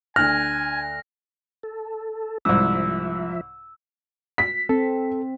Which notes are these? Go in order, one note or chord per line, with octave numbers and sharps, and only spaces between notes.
D2 G#5 F6 F#6 A#6
A4
C2 G#2 F3 E5 E6
B6
C4 A4